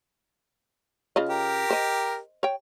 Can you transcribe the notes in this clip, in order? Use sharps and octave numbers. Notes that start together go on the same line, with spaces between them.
C#3 F4 D#5
G4 A#4
C5 D#5
C#5 G5